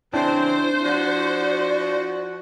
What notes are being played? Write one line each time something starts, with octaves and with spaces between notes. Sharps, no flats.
C#3 E3 C4 D4 E4 C5
F3 F#4 D5